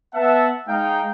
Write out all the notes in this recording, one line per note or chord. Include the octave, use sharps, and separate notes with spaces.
B3 E5 F#5 A5
G#3 D#4 F5 G5